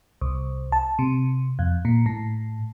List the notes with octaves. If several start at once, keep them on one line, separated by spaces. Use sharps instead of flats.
C2
A5
C3
F2
A#2
A2